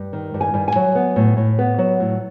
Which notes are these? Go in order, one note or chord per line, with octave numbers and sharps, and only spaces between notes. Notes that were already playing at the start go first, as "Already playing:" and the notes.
Already playing: G2
D#3
G2
G#5
G2
G#5
F#3
B3
A2
A2
B3
F#3
A2